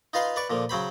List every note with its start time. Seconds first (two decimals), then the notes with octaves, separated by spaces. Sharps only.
0.13 D#4 F4 B4 F5 C6
0.36 B4 D5 C#6
0.50 A#2 D3 F3
0.69 C#3 F#3 C5 B5